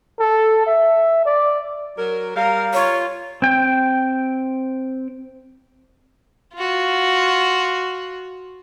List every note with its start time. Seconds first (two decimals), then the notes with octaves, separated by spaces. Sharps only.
0.20 A4
0.66 E5
1.25 D5
1.97 F#3 A#4
2.36 G3 A#4 F5
2.73 F4 C#5
3.42 C4 G5
6.55 F4 F#4